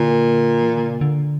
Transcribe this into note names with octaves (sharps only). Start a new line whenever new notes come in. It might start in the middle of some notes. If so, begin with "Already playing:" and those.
Already playing: A#2 D3
E3
D3
C#3
D3